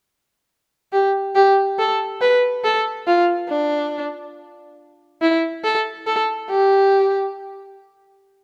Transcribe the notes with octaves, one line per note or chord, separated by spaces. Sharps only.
G4
G4
A4
B4
A4
F4
D4
E4
A4
A4
G4